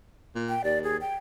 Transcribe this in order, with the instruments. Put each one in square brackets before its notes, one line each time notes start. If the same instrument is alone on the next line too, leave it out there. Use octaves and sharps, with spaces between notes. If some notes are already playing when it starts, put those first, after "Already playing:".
[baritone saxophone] A#2
[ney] G5
[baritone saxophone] D#2 [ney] D5
[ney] G#4
G5